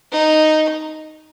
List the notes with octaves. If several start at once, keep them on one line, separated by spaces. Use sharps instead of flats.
D#4